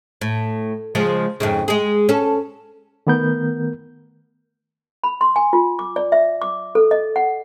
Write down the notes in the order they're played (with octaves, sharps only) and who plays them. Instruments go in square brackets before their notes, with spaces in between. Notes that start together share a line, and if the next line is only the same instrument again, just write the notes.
[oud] A2
C#3 F3 G#3
F2 G#2 C#3
G#3 G#4
C#4 A4
[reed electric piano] D#3 A3 B3 A#4 G6
[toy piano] B5
C6
G#5
F4
D6
D5
E5
D6
A4
D#5
F#5